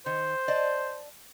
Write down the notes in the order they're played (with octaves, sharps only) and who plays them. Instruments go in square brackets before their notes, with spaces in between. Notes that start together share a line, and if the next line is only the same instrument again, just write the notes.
[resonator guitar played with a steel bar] D#3 [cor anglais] C5
[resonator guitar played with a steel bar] D5 D#5 A5